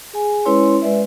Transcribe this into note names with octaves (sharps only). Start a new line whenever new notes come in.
G#4 G#5
G#3 C#4 E4 B4 C#5 C6
G#3 B4 D5 E5